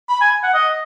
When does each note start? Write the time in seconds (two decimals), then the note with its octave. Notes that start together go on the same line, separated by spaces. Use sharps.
0.09 B5
0.21 G#5
0.43 F#5
0.54 D#5